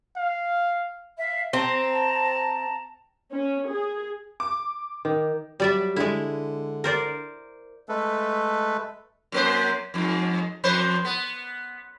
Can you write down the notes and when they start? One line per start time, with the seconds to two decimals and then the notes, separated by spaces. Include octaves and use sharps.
0.16 F5
1.18 E5 F5
1.53 C4 A5 A#5
3.33 C#4
3.69 G#4
4.40 D6
5.05 D#3
5.60 F#3 G3 D5 E5
5.96 D3 G#3 E4
6.84 A#4 C5 D5
7.89 G#3 A3 A4 B4
9.32 F#2 A#3 C5
9.94 F2 G#2
10.64 F2 B4 C5
11.05 B3